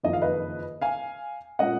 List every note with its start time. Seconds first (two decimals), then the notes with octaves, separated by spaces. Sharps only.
0.03 F#1 F2 D#3 D#5
0.13 F5
0.22 B4 D#5
0.81 F5 G#5
1.59 A#2 G#3 C#4 D#5 F#5